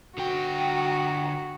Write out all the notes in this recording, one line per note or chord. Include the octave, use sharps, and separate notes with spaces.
D3 F#4 G5